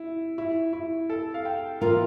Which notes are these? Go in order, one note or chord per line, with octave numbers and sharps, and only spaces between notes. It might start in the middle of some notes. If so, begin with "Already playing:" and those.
Already playing: E4
E4
E4
A4
F5
G5
E3 A#3 F4 A#4 F5